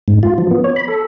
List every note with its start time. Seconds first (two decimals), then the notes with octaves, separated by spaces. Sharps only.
0.08 G#2
0.23 F4
0.38 F3
0.51 B3
0.64 C#5
0.76 B5
0.88 A4